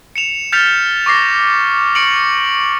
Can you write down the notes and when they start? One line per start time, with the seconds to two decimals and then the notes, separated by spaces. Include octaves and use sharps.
0.16 C#7 E7 F7
0.52 F6 G6 A6 B6 C#7 F7
1.06 C#6 D6 A#6 C7
1.95 C#6 C#7 D7 F#7